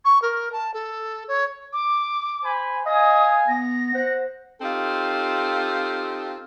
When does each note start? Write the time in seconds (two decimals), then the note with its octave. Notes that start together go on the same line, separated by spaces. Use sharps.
0.05 C#6
0.22 A#4
0.53 A5
0.74 A4
1.28 C#5
1.73 D6
2.43 C5 G#5 B5
2.86 D#5 F5 G#5 D#6
3.48 B3 A#6
3.95 C5 F#5
4.61 C4 D#4 F4 G4 A4